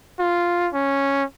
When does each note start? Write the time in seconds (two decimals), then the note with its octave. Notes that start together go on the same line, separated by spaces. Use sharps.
0.19 F4
0.74 C#4